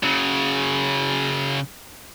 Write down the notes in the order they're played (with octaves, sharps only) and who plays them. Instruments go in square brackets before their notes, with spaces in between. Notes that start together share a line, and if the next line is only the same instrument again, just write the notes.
[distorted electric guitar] C#3 F#3